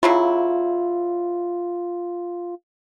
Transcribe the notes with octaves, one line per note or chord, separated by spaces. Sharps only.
C#3 F#3 E4 F4